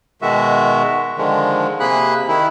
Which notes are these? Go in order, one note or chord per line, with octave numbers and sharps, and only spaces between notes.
B2 D#3 G#3 F#4 E5
D3 D#3 F3 G#3
C3 A#3 G#4 B5 F#6
D#3 E4